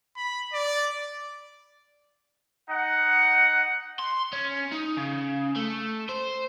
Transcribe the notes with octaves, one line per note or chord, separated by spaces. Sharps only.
B5
D5
D#4 F#5
C6
C#4
D#4
C#3
A3
C5